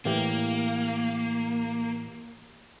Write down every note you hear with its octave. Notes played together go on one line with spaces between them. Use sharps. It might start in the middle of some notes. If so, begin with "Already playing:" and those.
A2 E3 A#3 G4